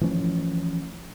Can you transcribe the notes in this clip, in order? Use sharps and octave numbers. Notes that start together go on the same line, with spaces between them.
E3 F3 A3 C#4